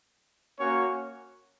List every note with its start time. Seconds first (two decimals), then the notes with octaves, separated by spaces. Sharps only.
0.58 A#3 C#4 F#4 C#5